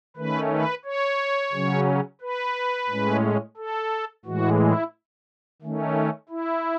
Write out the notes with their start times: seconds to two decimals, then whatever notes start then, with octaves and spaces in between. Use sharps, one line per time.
0.16 D#3 A3 C#4 B4
0.51 B4
0.85 C#5
1.53 C#3 F#3 C#4
2.21 B4
2.89 A2 G#3 C#4
3.57 A4
4.25 A2 E3 G#3 F#4
4.60 E4
5.62 D#3 A3 C#4
6.29 E4